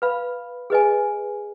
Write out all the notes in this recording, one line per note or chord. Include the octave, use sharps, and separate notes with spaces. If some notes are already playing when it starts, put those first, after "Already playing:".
B4 F5 B5
G#4 B4 D#5 G#5